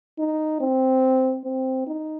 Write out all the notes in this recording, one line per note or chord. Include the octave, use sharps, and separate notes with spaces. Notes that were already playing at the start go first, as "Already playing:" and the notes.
D#4
C4
C4
D#4